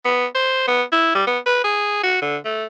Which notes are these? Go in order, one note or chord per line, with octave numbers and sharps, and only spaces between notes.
B3
C5
B3
E4
G3
B3
B4
G#4
F#4
D3
A3